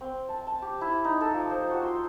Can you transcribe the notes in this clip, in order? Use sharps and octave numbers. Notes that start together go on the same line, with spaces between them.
C4
A5
A5
G4
E4
D#4
A4
F3
C5
F#4
C6